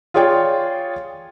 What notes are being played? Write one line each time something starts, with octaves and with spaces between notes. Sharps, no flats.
F4 G#4 C#5 D5 G5